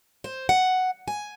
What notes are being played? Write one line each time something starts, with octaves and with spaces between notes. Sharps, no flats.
C5
F#5
G#5